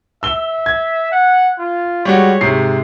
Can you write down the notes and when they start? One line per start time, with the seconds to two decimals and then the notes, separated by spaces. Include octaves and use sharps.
0.23 E5 E6 G7
0.66 G#6
1.12 F#5
1.58 F4
2.05 G3 G#3 F#4 C#5
2.41 G#2 C3 C7